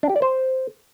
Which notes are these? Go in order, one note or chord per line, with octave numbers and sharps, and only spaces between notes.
D4
G4
D5
C5